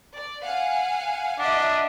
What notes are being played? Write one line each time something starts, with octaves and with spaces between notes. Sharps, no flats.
D5
F5 F#5 G#5
D4 D#5 E5 F#5